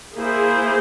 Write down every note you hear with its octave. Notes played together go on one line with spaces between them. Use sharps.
A#3 E4 G#4 C5